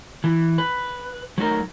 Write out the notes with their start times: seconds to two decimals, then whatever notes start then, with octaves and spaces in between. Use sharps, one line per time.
0.24 E3
0.58 B4
1.38 F#3 A3 D#4 A#4